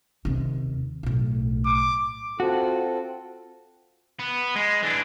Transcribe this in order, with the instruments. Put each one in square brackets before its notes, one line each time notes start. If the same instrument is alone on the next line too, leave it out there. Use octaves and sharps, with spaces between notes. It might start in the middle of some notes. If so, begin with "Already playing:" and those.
[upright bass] D#2 C3
B1 A2
[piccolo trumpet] D6
[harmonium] C4 F4 A4 [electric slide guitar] F#4
[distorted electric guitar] B3
G#3
E3 D4